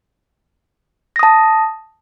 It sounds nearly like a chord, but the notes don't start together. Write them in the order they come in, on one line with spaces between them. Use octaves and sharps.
A#6 D#6 A5